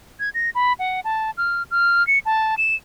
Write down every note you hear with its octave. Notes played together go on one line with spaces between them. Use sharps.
G#6
A#6
B5
F#5
A5
F6
F6
C#7
A5
E7